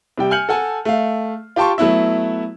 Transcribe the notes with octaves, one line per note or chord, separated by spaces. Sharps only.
C3 G3 G5
G#5 F6 G6 C#7 F#7
A4 F#5 G#5 A5
A3 F5
F4 G4 G5 A5 C6 C#6
F#3 A3 B3 E4 E5